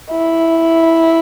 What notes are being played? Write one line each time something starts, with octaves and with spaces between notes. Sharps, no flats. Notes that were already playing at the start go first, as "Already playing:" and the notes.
E4